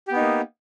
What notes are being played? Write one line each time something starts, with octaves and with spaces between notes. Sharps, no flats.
A#3 B3 D#4 G4